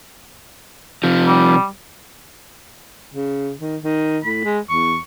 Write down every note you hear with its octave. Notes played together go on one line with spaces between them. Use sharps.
C3 F3
G3
C#3
D#3
D#3
A2 B5
G#3
E2 C#6